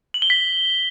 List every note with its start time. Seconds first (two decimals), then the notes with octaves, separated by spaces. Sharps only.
0.14 F#7
0.22 G7
0.30 B6